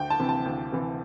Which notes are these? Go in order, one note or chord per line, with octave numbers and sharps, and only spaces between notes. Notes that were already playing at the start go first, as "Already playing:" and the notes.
Already playing: D2 G5
A5
C3 E3
A5
D2
C3 E3